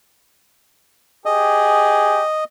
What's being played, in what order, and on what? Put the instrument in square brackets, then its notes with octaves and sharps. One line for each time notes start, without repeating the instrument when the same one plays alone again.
[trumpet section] G4 G#4 [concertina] D#5